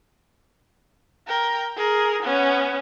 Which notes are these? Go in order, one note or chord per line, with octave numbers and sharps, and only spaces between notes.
A#4 G5
G#4 A#4
B3 C#4